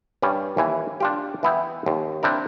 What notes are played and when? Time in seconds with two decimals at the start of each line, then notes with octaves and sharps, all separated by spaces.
0.22 G2 G3 C#4 D5
0.57 D#2 E3 G#5
1.00 D4 F4 G4
1.43 E3 B3 E4 G5
1.86 D#2
2.23 C4 D4 E4 A#4